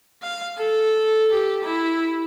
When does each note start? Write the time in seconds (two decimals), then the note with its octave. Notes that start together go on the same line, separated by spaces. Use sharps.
0.23 F5
0.57 A4
1.32 G4
1.64 E4